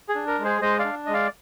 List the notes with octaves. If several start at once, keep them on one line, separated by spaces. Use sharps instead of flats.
G#4
D4
A#4
G#3
G#4 C5
G#3 C5 D#5
D5 F5
D4
G#3 D#5
D5 F5